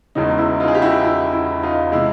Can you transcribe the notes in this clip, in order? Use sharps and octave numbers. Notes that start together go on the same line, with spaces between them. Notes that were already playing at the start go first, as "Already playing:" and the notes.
E1 E2 C#3 E3 D#4
E4
D#4 F4
G#4
G4
E4 F#4
E4
E4
D#4 F4
C3 E3 G#3 E4